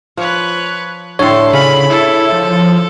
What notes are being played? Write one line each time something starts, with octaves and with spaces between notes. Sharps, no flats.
F3 B4 C#5
A2 D3 A4 C#5 C6
C#3 G#4 F5 B5
E4 A4
F3